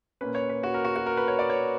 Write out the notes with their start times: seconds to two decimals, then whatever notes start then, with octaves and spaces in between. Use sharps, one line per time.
0.21 A#2 A#3 C#4 B4
0.35 C#5
0.50 B4
0.63 F#4
0.74 A#4
0.85 F#4
0.96 F#4
1.06 A#4
1.17 B4
1.28 C#5
1.39 D5
1.50 C#5